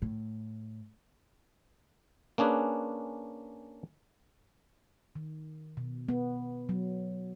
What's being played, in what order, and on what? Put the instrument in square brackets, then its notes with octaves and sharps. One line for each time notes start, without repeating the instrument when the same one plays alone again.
[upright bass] A2
[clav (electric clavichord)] A#3 C#4 D4 G#4 B4
[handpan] D#3
B2
B3
F#3